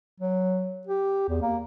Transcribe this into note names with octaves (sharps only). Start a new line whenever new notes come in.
F#3
G4
E2
A#3